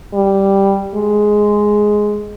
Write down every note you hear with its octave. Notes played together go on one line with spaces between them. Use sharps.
G3
G#3